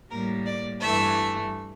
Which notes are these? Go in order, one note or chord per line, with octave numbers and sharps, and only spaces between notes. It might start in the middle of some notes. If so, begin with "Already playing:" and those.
A2 G3 A#3 A#4
D5
G2 E3 A3 E5